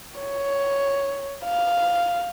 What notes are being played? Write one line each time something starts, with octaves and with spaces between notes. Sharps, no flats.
C#5
F5